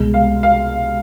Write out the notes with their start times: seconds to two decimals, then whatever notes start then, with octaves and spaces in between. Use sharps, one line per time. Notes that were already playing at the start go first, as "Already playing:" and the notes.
Already playing: C2 B2 G#3
0.14 F5
0.43 F5